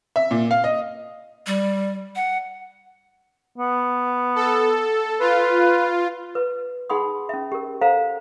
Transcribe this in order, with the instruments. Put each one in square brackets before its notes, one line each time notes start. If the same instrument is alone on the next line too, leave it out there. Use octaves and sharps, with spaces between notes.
[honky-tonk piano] E5
A#2
F5
D#5
[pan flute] G3
F#5
[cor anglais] B3
[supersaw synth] A4
[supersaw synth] F4 [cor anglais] B4
[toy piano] B4
D#4 G#4 F#5 B5 C6 D#6
C#4 E5
G4 A#4
A4 C5 F5 F#5 A#5